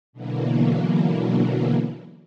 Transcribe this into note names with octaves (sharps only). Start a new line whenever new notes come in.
B2 D3 E3 F#3 A#3